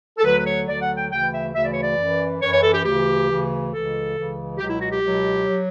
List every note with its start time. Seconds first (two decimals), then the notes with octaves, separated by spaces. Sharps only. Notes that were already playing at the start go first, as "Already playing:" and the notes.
0.18 A4
0.24 D2 D3 F#3 B4
0.39 B4
0.46 C#5
0.68 D2 D3 F#3 D5
0.82 F#5
0.96 G5
1.11 D2 C#3 E3 G5
1.33 E5
1.55 D2 C#3 E3 E5
1.64 D5
1.73 C#5
1.82 D5
1.98 F#2 E3
2.41 F#2 E3 C#5
2.52 C#5
2.63 A4
2.74 G4
2.85 D2 C#3 E3 G4
3.28 D2 C#3 E3
3.71 C#2 C#3 E3 A4
4.15 C#2 C#3 E3
4.58 C#2 B2 F#3 G4
4.69 E4
4.80 F#4
4.91 G4
5.01 C#2 B2 F#3
5.45 F#3